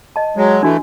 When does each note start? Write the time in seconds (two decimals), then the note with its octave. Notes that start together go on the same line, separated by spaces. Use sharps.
0.16 D#5 A5
0.37 F#3 G#3
0.63 E3 A3 D4 F#4